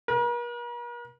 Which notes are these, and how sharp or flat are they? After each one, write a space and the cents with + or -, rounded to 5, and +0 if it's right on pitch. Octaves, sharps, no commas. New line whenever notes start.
A#4 +45